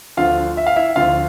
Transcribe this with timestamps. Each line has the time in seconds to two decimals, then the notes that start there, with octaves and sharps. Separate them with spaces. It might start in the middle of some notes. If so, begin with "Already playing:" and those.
0.17 D2 D3 F3 F4 F5
0.57 E5
0.67 F5
0.76 E4 E5
0.96 D2 D3 F3 F4 F5